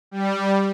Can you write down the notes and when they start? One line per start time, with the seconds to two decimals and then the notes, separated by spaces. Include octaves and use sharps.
0.11 G3